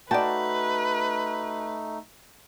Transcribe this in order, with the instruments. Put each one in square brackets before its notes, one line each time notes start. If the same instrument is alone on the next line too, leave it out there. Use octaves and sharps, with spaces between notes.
[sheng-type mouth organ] A3 D#4 [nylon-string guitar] F#4 G5 [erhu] B4 [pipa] D5 A5